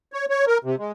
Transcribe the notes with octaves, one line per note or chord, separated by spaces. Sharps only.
C#5
C#5
A#4
C3
G#3